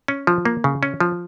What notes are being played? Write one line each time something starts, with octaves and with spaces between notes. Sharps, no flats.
C#4
F3
A#3
C#3
C#4
F3